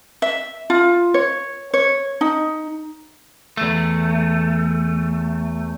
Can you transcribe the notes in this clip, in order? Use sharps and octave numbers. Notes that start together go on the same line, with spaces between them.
E5
F4
C#5
C#5
D#4
E2 A3